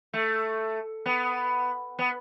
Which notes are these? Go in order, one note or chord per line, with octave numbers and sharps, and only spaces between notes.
A3
B3
B3